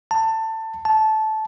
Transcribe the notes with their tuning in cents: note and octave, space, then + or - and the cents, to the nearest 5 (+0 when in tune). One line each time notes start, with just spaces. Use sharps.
A5 +20
A5 -15